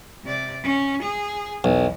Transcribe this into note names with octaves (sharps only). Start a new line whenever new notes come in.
C3 D5
C#4
G#4
B1 E2